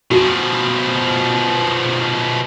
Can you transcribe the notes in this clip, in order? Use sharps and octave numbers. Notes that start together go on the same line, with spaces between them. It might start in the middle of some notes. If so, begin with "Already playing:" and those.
B2 F3 F#4